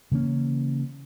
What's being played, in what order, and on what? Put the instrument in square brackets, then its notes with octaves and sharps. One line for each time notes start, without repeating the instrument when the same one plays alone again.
[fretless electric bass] C#3 E3 A#3 C#4